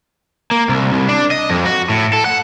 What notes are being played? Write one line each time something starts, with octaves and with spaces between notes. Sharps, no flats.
A#3
C2
C2
D4
D#5
F2
F#4
A2
A4
F#5